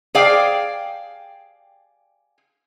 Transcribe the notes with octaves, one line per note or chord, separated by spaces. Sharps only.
G#4 C5 D5 F5 G5